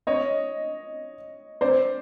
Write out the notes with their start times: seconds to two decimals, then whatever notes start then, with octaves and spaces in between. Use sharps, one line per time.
0.07 C#5 D#5
1.61 C5 D5